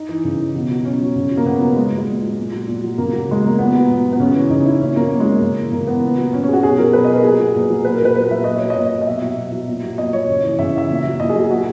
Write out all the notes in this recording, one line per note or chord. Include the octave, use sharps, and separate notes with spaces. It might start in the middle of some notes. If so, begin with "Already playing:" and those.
Already playing: D#4
E3
C#3
E3
B2
F#3
B2 C#4
F#3
C#3
F#3
A#3
C#3 B3
F#3 A#3
A#2 G#3
F#3
G#3
A#2
F#3
A#2
F#3
A#2
F#3
C#3 A#3
F#3
C#3 G#3
F#3 A#3
A#2 B3
F#3
A#2
F#3
B3
C#3 C#4
E3
C#3 D#4
E3 E4
A#2 C#4
F#3 A#3
A#2 A#3
G#3
F#3 A#3
C#3
E3
C#3 A#3
E3 B3
A#2
F#3
A#2 C#4
C#4
F#3 G#4
F#4
B2 G#4
F#3 A#4
B2 B4
D#5
F#3 A#4
A#2 G#4
F#3
A#2
F#3
A#2 B4
A#4
F#3 B4
A#2 B4
F#3 E5
A#2 D#5
F#3 C#5
D#5
A#2
F#3
D#5
B2 E5
F#3
B2
F#3
A#2
F#3
A#2 D#5
F#3 C#5
C#3
E3
C#3 E5
E3 E5
A#2
F#3
A#2 D#5
G#4
F#3
G#4
A#2 F#4